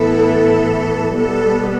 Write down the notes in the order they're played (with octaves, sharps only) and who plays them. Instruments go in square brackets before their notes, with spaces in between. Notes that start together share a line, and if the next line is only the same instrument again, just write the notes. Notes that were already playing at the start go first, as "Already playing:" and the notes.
Already playing: [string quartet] A2 E3 B3 E4 [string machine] A4
[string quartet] B2 G3 B3 [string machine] A4